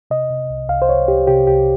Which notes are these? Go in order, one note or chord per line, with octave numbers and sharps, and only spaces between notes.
C3 D#5
C3
C2
C2 F5
C5
C2 C#5
C2 G4
C3 G4
C2 G4